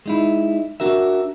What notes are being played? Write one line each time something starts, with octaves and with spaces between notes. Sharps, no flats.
G#3 D#4 E4
D4 F#4 A#4 E5